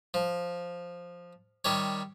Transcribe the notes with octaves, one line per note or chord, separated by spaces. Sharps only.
F3
D#3 G3 C#5